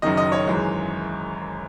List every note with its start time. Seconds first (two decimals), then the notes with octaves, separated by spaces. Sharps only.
0.02 F#1 F#2 D#3 D#5
0.17 D#5
0.32 C#5
0.47 G#1 F#2 E3 G#3